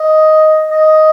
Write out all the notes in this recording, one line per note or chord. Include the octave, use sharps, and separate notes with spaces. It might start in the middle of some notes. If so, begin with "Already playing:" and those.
Already playing: D#5
D#5